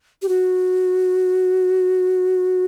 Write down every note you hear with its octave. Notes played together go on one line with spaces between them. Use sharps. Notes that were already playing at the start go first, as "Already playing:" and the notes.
G4
F#4